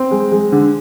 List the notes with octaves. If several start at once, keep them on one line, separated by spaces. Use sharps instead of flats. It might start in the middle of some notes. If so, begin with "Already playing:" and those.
Already playing: C4
G#3
G#3
D3